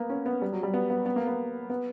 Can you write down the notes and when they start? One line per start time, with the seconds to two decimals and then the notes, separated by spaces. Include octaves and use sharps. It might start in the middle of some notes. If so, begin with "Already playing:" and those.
Already playing: A#3 B3
0.10 C#4
0.26 B3
0.42 G3
0.52 F#3
0.63 G3
0.74 B3
0.90 B3
1.06 B3
1.16 A#3
1.27 B3
1.70 B3